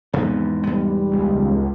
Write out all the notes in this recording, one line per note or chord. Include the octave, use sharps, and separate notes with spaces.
E2 G#2 C3 F3 B3
B2 G3 B3
C#2